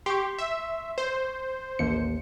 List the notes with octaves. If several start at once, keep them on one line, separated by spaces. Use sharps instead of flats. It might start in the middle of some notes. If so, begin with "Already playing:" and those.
G4 C6 C#6
E5
C5
A1 D#2 C#7